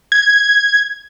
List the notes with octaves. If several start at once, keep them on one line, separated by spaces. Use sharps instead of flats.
G#6